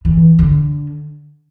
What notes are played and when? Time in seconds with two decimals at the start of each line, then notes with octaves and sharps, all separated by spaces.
0.05 E3
0.39 D3